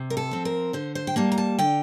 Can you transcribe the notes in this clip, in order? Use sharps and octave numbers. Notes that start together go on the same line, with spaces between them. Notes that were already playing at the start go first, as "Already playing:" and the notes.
Already playing: C3
A#4
A4
F3 C4
A#4
D3 C5
C5
G5
G3 A#3 A5
A#5
A5
D3 G5